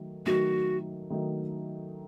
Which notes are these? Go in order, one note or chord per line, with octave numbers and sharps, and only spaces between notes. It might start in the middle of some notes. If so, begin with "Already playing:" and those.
Already playing: D#3 F#3 A3
D#3 F#3 A3 D#4 F#4
D#3 F#3 A3 D#4